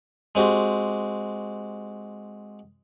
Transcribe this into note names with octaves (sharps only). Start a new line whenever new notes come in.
G#3 C4 F#4 G4